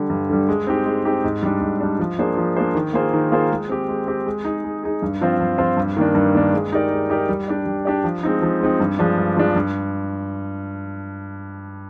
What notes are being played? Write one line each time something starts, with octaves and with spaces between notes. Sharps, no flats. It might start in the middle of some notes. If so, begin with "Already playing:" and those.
Already playing: D3 G3
G2
D3 G3
G#3
C4 D#4 G4
G#3
C4 D#4 G4
G#2
G3 D4
G#2
G3 D4
F3
A#3 D4 G#4 C5
F3
A#3 D4 G#4 C5
D#3
A#3 F4 G#4 C5
D#3
A#3 F4 G#4 C5
G#3
C4 G4
G#3
C4 G4
G#3
D#4 G#4
G#3
D#4 G#4
G2
F3 C4 F4 C5
G2
F3 C4 F4 C5
G2
D#3 A#3 D4
G2
D#3 A#3 D4
G#3
D#4 G4 A#4 D5
G#3
D#4 G4 A#4 D5
G3
D4 G4 D5
G3
D4 G4 D5
F3
G#3 C4 D#4
F3
G#3 C4 D#4
G2
F3 G#3 D4
G2
F3 G#3 D4
G2